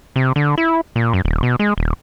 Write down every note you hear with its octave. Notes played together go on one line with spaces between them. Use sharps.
C3
D3
E4
A#2
F#2
D#1
B2
G#3
D#1